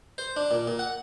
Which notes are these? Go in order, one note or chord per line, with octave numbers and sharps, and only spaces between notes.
C5
D4
A#2
A#2
F#5